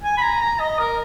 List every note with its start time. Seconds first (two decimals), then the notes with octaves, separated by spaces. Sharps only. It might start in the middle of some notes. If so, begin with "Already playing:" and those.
0.04 G#5
0.17 B5
0.22 A#5
0.41 A#5
0.60 D#5
0.79 A#4